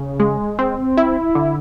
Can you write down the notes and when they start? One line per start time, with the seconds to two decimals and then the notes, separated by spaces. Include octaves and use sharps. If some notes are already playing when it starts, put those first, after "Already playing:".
Already playing: C#3
0.20 G#3
0.59 C4
0.97 E4
1.35 D3